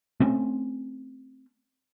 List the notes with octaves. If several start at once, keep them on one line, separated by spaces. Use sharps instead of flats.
A3 C4 C#4